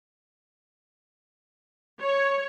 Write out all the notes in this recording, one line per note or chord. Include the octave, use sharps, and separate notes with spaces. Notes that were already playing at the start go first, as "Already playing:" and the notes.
C#5